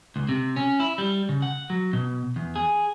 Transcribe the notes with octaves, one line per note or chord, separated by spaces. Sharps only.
C#2
C3
C#4
E4
G3
C#3
F#5
F#3
B2
E2
G#4